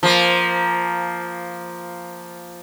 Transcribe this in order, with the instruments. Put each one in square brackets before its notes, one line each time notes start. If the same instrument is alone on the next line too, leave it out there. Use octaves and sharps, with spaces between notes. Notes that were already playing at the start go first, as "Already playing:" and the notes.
[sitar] F3 A#3